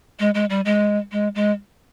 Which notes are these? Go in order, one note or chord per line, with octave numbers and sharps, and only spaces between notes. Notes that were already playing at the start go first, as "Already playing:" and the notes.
G#3
G#3
G3
G#3
G#3
G#3